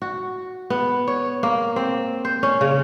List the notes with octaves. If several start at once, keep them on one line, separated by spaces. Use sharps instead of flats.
F#4
B3
C#5
A#3
C4
C5
C#4
C#3